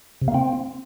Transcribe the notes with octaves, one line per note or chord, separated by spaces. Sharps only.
C3
A#3
C4